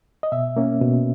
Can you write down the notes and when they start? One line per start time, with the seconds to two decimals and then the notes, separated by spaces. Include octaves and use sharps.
0.23 D#5
0.32 B2 E5
0.57 A#3 C#4
0.82 B2